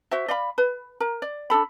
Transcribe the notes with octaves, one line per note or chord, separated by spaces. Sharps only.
F#4 C5 E5
D5 F5 B5
B4
A#4
D5
D4 D#4 A4 B5